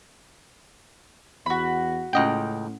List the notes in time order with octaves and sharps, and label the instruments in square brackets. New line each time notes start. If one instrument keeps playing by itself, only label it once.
[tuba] E2 [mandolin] F#4 B5
[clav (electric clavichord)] C#2 D#5 G5 [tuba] A2 [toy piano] C#4 F#5